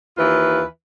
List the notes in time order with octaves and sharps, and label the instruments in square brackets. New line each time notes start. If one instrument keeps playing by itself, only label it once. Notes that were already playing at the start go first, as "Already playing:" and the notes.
[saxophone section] D#2 E3 F4 B4